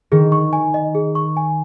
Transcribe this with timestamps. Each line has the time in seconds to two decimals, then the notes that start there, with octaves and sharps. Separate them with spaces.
0.12 D#3 G#4
0.32 C#6
0.53 G#5
0.74 D#5
0.95 G#4
1.15 C#6
1.37 G#5